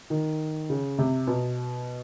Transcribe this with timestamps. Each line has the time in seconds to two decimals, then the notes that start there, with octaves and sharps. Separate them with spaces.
0.10 D#3
0.70 C#3
0.98 C3
1.28 B2